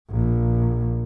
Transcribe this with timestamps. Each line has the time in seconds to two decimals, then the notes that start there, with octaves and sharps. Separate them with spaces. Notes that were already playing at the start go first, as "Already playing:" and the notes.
0.10 A#1